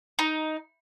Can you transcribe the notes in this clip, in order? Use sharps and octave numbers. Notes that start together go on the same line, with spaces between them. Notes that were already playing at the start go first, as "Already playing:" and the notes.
D#4